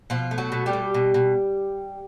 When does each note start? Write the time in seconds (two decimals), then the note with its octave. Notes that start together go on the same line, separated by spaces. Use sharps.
0.10 B2 F3 F4
0.31 A3
0.38 F#3 F#4
0.52 B2
0.66 G3 G4
0.73 B2
0.94 B2
1.14 B2